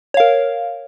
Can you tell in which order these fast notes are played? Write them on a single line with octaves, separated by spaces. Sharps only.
C#5 F5 A#4